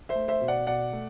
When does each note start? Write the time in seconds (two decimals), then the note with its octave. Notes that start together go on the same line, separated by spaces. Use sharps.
0.09 C5 E5
0.15 A3
0.28 C5 E5
0.41 B2
0.48 D5 F#5
0.67 B2 D5 F#5
0.93 A3